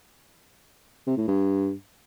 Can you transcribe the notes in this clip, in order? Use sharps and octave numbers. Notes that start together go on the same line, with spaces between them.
C3
A2
G2